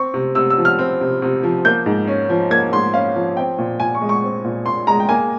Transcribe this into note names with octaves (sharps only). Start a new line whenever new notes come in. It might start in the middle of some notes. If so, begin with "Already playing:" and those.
Already playing: C4 C#6
C3
C3 E6
E6
F3
F6
C4
C3
C3
F3
A#3 G6
G#2
C#4
F3
A#3 G#6
G#2 C6
C#4 F5
F3
C4 G5
A#2
A#2 G#5
C#6
G#3
C#6
C4
A#2
A#2 C6
G#3 A#5
G5
A#3 G#5